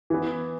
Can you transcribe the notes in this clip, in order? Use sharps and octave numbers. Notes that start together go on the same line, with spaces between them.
E3 B3